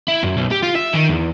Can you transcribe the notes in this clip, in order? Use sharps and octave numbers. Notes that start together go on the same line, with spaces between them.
E4
F#2
B1
G4
F4
E5
D#3
E2